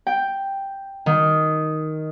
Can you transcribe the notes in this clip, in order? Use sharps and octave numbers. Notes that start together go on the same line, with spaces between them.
G5
D#3